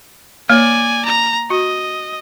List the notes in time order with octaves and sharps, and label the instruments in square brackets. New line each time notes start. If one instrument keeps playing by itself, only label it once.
[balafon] A#3 C#5 [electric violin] D5 G#5
[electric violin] A#5
[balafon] F#4 [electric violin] D#5